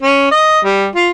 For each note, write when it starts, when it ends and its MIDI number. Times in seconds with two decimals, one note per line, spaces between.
0.03 0.31 61
0.31 0.59 75
0.65 0.86 55
0.95 1.10 65